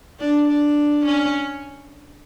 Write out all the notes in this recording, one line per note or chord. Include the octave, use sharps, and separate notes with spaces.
D4
D4
C#4